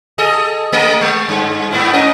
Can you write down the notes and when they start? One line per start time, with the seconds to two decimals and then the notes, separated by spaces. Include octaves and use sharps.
0.18 G#4 A4 D#5
0.73 A3 A#4 D#5
1.01 G#3
1.29 G2
1.71 G#2 B3 E4
1.93 C#4 A#4 D#5